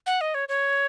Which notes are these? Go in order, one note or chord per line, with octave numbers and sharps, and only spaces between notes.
F#5
D#5
C#5
C#5